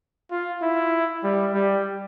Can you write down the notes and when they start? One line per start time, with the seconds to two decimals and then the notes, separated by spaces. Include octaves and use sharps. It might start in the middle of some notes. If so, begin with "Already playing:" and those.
0.31 F4
0.62 E4
1.23 G3
1.54 G3